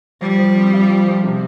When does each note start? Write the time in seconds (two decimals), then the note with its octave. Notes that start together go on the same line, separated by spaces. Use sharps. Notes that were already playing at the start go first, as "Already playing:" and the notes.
0.21 F3 G3
0.38 F3
0.56 C4
0.73 F4
0.89 F3
1.07 F3
1.23 C3